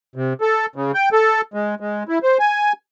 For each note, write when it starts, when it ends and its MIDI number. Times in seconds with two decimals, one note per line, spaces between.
0.16 0.33 48
0.41 0.66 69
0.76 0.92 49
0.94 1.09 79
1.13 1.41 69
1.54 1.75 56
1.80 2.03 56
2.09 2.19 64
2.23 2.38 72
2.39 2.73 80